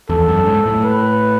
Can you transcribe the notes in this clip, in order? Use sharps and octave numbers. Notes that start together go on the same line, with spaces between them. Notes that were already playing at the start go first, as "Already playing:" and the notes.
E2 A4
F#2
G#2
A2
B4